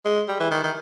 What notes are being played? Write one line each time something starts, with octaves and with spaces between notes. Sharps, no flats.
G#3
G3
E3
D#3
D#3